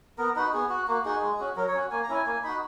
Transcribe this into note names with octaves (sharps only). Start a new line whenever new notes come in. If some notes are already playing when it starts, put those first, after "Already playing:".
B3 A#4
D#4 F#4 B4
B3 G#4
F#4
A#3 F#4
D#4 F#4 G#4
G#3
C#4 F#4
F#3 A#4
C#5
C#4 F#4
A#3 G#5
A#5
C#4 E4 G#5
A#3 G#5
D#4 F#4 B5